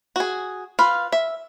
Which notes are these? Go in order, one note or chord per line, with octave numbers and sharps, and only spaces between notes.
F#4 G#4
F4 B4 F5
E5